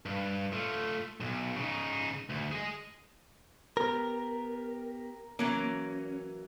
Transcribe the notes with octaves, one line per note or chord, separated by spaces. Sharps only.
G2
A3 F4
B1
C#3 D#4
D2
G#4 D#5
B3 G4 A#4
E3 F#3 A#3 C#4